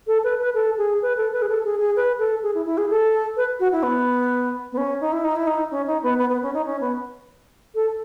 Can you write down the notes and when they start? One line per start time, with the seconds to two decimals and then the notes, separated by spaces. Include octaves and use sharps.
0.07 A4
0.24 B4
0.39 B4
0.54 A4
0.78 G#4
1.02 B4
1.17 A4
1.32 B4
1.42 G#4
1.49 A4
1.65 G#4
1.80 G#4
1.96 B4
2.19 A4
2.43 G#4
2.55 E4
2.66 E4
2.78 G#4
2.90 A4
3.37 B4
3.60 F#4
3.72 E4
3.83 B3
4.72 B3
4.77 C#4
5.01 D#4
5.12 E4
5.24 D#4
5.36 E4
5.47 D#4
5.71 C#4
5.87 D#4
6.03 B3
6.19 B3
6.29 B3
6.42 C#4
6.54 D#4
6.66 C#4
6.81 B3
7.75 A4